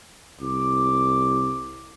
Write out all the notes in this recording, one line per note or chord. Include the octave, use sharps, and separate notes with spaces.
C2 D6